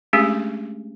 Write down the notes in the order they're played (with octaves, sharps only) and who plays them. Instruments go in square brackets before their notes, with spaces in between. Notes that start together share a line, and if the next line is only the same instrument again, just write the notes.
[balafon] G#3 A3 C#4 D4 G4 G#4